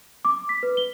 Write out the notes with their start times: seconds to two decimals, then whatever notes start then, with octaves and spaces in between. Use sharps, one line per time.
0.25 D6
0.49 B6
0.63 B4
0.77 G7